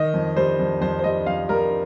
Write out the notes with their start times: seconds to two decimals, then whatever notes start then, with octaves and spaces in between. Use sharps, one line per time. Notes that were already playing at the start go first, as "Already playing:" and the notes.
Already playing: D#3 D#5
0.14 F2
0.36 G3 C5
0.59 F2
0.81 F2 C5
0.99 C5
1.04 G3 D#5
1.26 F2 F5
1.49 G3 A#4